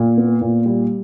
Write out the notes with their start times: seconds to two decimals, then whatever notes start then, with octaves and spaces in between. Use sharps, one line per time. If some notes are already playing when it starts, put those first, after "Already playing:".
Already playing: A#2
0.17 B3
0.41 A#2
0.66 G3